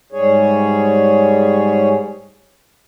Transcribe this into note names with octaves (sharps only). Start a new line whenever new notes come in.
G#2 G3 G#4 C#5